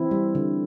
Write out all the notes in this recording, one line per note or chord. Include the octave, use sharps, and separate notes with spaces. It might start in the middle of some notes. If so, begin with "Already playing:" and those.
Already playing: E3 C4 E4
G3
D3